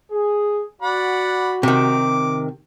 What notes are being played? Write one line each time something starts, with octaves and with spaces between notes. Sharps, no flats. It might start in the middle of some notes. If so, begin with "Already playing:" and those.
G#4
F#4 D5 F#5 B5
C3 D#3 D6